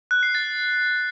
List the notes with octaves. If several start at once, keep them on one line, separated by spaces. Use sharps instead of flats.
F#6
C7
A6